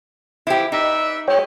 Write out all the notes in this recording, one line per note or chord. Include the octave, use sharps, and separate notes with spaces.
E3 F3 E4 G4
D#4 B4 D5 E5
F3 F#3 G#3 C#5 G5